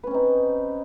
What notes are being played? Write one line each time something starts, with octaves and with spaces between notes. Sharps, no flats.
C4 C#4 D#4 B4